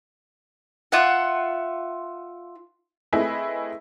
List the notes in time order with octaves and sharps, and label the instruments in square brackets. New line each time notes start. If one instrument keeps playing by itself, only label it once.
[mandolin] F4 E5 F#5
[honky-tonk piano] A3 C4 E4 G#4 B4 D#5